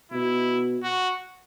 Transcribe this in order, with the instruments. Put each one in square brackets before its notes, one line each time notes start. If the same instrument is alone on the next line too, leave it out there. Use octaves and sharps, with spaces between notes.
[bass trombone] B2 [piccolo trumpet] E4
[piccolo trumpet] F#4